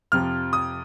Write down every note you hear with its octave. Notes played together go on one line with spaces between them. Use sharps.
F2 C3 F3 F6
D#6